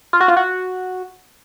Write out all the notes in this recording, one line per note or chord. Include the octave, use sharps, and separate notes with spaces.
F4
F#4
F4
F#4